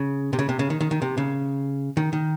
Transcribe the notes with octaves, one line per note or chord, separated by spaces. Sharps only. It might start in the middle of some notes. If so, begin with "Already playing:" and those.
Already playing: C#3
C3
C#3
C3
C#3
D#3
D#3
D#3
C3
C#3
D#3
D#3